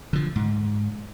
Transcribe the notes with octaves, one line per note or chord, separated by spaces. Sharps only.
D3 F3
G#2